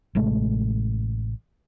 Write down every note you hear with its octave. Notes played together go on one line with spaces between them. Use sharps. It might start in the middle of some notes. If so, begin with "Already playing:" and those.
A1 C3 G#3 A3